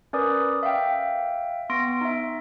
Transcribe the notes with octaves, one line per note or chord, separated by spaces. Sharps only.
C#4 A#4 B4 D5 D6 D#6
E5 F5 G5
B3 C6 A#6 D7
D#4 E5